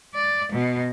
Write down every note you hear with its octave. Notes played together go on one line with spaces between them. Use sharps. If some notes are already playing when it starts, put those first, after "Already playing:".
D5
B2